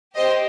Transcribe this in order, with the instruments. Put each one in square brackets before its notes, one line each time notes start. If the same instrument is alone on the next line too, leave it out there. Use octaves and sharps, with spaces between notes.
[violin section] C4 G4 C5 D#5